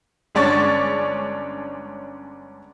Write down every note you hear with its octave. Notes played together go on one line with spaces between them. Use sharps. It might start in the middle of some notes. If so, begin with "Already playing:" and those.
G1 G#3 C#4 D4 C#6 A6